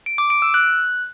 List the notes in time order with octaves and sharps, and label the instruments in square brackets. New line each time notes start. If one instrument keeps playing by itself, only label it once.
[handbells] D7
D6
D7
E6
F#6